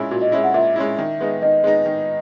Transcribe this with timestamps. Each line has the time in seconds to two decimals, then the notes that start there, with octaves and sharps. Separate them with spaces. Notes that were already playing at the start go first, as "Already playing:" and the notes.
Already playing: A#2 G#3 C#4 E4
0.11 A#2 F#4
0.22 D#5
0.32 G#3 C#4 E4 E5
0.44 F#5
0.54 A#2 E5
0.76 G#3 C#4 E4
0.99 D#3
1.21 G#3 B3 D#4
1.42 D#3 D#5
1.64 G#3 B3 D#4
1.86 D#3